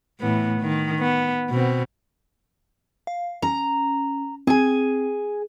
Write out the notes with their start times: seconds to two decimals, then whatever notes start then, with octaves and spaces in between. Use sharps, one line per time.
0.20 A2 E3 B3
0.61 D#3
0.99 B3
1.50 B2 C4
3.07 F5
3.42 C#4 A#5
4.47 C4 G#4 G#5